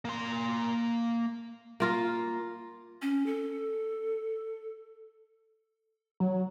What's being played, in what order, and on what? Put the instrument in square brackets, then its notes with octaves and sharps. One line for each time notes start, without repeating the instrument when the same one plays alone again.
[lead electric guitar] A#3 C6
[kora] A#3 F4 A#4
[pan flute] C#4
A4
[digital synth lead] F#3